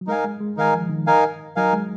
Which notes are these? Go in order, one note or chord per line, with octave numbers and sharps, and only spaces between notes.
F#3
G#3 D#4 A#4 F5 G#5
G#3
G#3
D#3 D#4 A#4 F5 G#5
F3
D#3
D#4 A#4 F5 G#5
F#3 D#4 A#4 F5 G#5
G#3